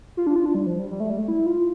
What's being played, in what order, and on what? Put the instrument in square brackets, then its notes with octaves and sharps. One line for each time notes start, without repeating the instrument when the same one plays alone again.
[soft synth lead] F4
D4
F4
D4
G3
F3
G3
G3
A3
G3
A3
E4
F4